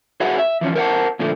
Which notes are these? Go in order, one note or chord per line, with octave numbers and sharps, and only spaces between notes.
F#4 G#4 B4 C#5 E5 F#5
E5
E3 F3 C#4
A#4 C5 F5 F#5 A5
A#2 D3 F3 A3